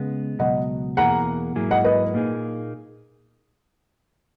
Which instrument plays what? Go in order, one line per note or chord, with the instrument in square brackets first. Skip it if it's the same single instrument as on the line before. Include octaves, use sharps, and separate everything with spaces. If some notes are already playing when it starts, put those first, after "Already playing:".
Already playing: [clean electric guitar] C#3 G#3 B3
[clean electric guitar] C#2 B2 F#3 [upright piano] D#5 F#5
[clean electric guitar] E2 B2 A#3 E4 G#4 [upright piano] F#5 A#5
[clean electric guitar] G#2 F#3 A#3 E4 G#4
[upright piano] D#5 F#5
B4 D#5
[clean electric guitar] A#2 A#3 D#4 G#4